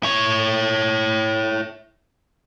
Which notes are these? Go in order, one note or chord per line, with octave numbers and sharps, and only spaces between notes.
E4 C#5